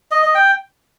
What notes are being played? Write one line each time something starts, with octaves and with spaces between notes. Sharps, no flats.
D#5
D#5
G5